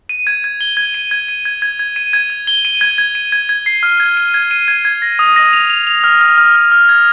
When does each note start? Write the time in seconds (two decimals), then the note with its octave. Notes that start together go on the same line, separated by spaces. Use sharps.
0.09 D#7
0.27 G#6
0.44 G#6
0.61 G7
0.77 G#6
0.94 D#7
1.11 G#6
1.28 D#7
1.45 G#6
1.62 G#6
1.79 G#6
1.96 D#7
2.13 G#6
2.30 G#6
2.47 G7
2.65 D#7
2.81 G#6
2.98 G#6
3.15 D#7
3.32 G#6
3.49 G#6
3.66 C7
3.83 F6
4.00 G#6
4.17 D#7
4.34 G#6
4.51 D#7
4.68 G#6
4.85 G#6
5.02 A#6
5.19 D#6
5.36 A#6
5.53 F7
5.70 F7
5.87 F7
6.04 F6
6.21 F6
6.38 F6
6.55 F6
6.72 F6
6.89 G#6